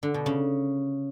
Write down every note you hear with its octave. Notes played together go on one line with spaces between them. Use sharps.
D3
B2
C#3